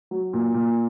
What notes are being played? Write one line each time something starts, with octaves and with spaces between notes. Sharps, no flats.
F#3
A#2
A#2